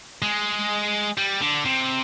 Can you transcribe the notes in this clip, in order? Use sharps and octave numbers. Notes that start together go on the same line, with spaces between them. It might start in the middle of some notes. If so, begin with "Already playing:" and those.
G#3
G3
D3
C3